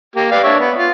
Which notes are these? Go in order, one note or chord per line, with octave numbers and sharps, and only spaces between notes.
A#3 G4
B4 D5 F5
D4 C#5 E5
B3
F4